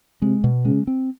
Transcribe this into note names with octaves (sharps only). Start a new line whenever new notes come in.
C3 G#3
B2
C#3 G#3
C4